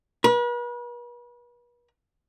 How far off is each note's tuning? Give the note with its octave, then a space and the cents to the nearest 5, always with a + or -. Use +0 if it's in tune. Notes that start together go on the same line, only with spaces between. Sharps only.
B4 -40